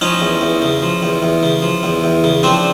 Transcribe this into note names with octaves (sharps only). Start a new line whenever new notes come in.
F3 C#4 D#4
E2
E2
C#3
F3
E2
E2
C#3
F3
E2
E2
C#3
F3 C4 D4